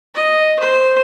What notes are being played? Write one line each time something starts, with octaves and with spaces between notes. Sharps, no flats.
D#5
C5